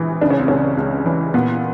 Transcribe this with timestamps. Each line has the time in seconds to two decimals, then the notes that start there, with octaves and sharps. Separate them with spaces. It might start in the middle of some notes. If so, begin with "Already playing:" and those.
Already playing: A#1 E3
0.21 C#3 D4
0.30 C#4
0.40 C4
0.48 C#2 C#4
0.77 C#2
1.06 E3
1.34 A#2 B3